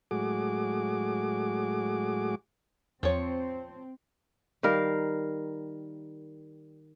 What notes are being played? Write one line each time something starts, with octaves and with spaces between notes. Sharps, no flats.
A2 F#3 G#3 F#4 G#4 D6
E2 F3 C4 C#5
D#3 G3 A#4 F5